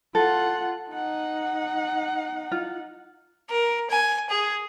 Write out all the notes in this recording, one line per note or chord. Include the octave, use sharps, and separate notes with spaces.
F4 A4 F#5
D#4 F#5
F4
A#4
G#5
G#4